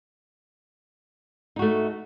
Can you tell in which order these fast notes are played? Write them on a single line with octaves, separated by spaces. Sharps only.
D#4 F#4 A3